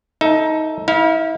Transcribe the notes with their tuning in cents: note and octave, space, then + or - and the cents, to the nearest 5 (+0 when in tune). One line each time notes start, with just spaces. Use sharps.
D#4 +15 A4 +0 E5 +0
E4 -35 F5 +0